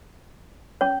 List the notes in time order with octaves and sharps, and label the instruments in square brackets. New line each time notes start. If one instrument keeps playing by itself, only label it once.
[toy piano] C#4 C#5